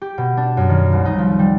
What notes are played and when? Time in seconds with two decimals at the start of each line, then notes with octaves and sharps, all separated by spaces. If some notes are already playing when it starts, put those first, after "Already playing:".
0.02 G4
0.18 B2
0.37 D4
0.57 F#2
0.69 D#3
0.92 C2
1.05 D#4
1.18 F3
1.39 G3